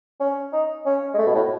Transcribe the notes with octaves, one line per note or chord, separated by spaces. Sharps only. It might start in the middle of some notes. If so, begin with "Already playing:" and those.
C#4
D#4
C#4
G#3
A3
B2
A2